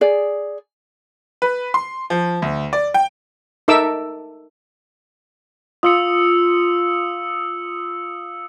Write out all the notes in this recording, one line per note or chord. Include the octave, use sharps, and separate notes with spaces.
G#4 D5
B4
C6
F3
D2
D5
G5
D#4 A4 A#4 E5 D6 E6
F4 D#6 E6 C#7